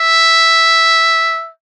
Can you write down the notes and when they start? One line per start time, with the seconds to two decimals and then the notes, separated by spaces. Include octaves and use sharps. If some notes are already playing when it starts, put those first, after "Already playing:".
Already playing: E5